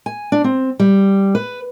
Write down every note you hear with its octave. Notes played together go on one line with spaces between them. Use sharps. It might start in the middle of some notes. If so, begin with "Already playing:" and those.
G#5
D4
C4
G3
B4